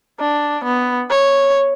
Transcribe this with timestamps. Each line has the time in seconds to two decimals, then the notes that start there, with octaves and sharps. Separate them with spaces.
0.20 D4
0.64 B3
1.10 C#5